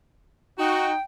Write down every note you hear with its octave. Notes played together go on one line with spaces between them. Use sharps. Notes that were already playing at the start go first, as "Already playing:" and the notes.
D#4 F#4 G5